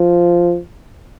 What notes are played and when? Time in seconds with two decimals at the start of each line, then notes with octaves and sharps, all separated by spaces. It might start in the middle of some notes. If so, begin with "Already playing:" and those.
Already playing: F3